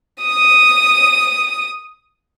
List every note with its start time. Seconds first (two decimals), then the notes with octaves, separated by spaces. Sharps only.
0.22 D#6 D#7